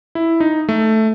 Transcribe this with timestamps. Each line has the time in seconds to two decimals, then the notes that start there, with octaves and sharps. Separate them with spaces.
0.15 E4
0.40 D#4
0.69 A3